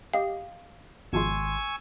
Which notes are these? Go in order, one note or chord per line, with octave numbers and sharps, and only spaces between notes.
G4 D#5 F5
G#1 B2 F3 G#3 G#5 C6 C#6 E6